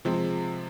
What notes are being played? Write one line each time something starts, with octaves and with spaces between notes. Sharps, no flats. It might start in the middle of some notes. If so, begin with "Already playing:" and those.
C3 F3 G#3 C4